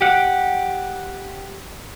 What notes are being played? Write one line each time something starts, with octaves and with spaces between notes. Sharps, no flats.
G4 F#5